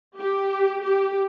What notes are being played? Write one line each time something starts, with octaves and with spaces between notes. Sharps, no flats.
G4
G4